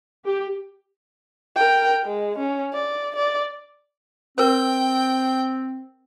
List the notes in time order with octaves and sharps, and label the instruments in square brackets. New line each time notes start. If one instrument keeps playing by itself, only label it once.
[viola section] G4
[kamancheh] A#4 G5
G#3
C#4
D5
D5
[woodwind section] C4 [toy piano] A#4 C5 [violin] G5